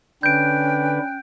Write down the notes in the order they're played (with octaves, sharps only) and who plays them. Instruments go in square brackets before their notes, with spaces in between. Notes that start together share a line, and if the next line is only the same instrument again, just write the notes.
[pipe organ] D3 D4 B4 [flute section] C#4 G5 F#6 [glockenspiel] G6 D7